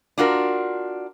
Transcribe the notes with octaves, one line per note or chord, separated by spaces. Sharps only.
D4 F4 F#4 A#4